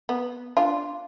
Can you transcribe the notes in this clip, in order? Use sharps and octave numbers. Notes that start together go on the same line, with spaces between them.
B3
D4 F4